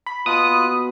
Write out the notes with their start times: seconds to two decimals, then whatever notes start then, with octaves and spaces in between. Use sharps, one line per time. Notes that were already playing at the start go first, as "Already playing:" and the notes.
0.06 B5
0.26 B2 F4 D#6 F#6